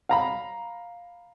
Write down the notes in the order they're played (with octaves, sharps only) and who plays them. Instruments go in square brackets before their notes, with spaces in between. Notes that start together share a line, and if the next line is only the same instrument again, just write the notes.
[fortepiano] F5 A#5 B5